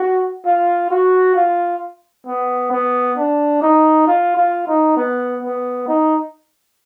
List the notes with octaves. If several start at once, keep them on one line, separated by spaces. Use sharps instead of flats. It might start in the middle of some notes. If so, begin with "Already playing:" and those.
Already playing: F#4
F4
F#4
F4
B3
B3
D4
D#4
F4
F4
D#4
B3
B3
D#4